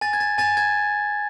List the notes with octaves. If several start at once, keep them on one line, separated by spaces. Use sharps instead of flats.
G#5 A6
G#6
A6
G#5 A6
G#6